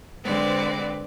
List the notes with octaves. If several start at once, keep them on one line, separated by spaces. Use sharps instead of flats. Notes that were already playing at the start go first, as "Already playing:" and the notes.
D3 G#3 C4 B4 C5 D5